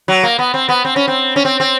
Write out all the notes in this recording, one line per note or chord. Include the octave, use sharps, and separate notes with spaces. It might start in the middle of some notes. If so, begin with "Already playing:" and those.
F#3
A#3
B3
C4
B3
C4
C#4
C4
C#4
C4
C4